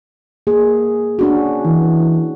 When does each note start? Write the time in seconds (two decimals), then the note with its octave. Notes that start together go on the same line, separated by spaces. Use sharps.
0.47 A#3 G#4
1.19 C#4 D4 F#4
1.65 E3